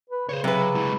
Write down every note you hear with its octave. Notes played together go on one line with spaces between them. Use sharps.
B4
C#3 C5 C#5
C3 F#3 B4
G#3 E4